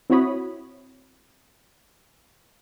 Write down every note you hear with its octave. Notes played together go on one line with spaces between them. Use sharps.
C4 E4 F#4 C#5 B5 D#6